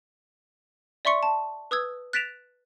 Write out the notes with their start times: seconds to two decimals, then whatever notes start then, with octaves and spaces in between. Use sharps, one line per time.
1.05 D5 E5 C6 C#6 C#7
1.23 A5
1.71 B4 D#6 E6 G#6
2.13 F#6 A6 B6 D7 E7 F7